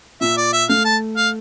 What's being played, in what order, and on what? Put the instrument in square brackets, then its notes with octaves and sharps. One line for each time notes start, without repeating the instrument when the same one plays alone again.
[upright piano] A#2 [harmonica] E5
[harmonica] D5
E5
[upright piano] A3 [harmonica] F5
[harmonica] A5
F5